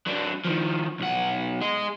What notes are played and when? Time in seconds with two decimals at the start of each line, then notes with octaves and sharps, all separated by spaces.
0.07 F#3 D4
0.45 D#3 F3
1.00 B1 F#5
1.61 G#4 D#5